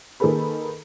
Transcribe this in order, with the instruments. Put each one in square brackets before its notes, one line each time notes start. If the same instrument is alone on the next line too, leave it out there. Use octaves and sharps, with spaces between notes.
[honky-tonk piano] D#3 A#3 G#4 A4 B4 B5